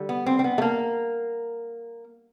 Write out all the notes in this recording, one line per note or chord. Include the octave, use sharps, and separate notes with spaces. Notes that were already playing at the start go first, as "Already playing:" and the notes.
Already playing: D3 G3
B3
C4
C4
B3
A3
A#3